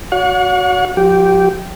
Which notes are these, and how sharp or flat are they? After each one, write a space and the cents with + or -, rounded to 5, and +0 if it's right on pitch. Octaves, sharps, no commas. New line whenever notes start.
F#4 +0 C#5 +40 F#5 -40
F3 +40 G4 -10